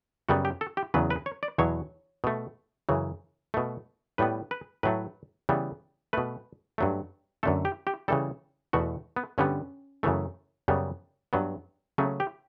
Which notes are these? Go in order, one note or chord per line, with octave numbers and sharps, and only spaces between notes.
F#2 C#3 G3 B3 F#4
G4
A4
G4
E2 C#3 F#3 B3 B4
B4
C#5
D5
E2 B2 F#3 C#5
B2 A3
F#2 C#3 E3
B2 A3
A2 G3 B3 B4
B4
A2 F#3 A3 B4
C#3 E3 G3 B3
B2 A3 B4
G2 F#3 A3
F#2 D3 A3 A4
G4
G4
C#3 E3 G3 A4
E2 B2 A3 F#4
B3
G2 D3 G3 B3 C#4
F#2 C#3 E3 A3
F#2 C#3 G3 B3
G2 F#3 B3
C#3 F#3 A3 C#4
G4